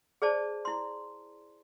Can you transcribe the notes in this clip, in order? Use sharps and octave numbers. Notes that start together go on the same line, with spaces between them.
G#4 C5 D5 A5
E4 C6